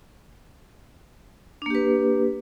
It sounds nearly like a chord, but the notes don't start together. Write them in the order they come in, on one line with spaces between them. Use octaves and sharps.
D4 A#3 G4 B4